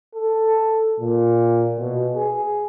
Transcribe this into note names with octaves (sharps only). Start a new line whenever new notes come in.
A4
A#2
B2
G#4